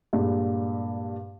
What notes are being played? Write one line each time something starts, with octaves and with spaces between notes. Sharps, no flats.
G2 A#2 G#3